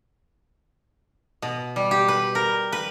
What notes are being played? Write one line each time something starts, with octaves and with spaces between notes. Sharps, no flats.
B2
G3
G4
B4
A#4
B4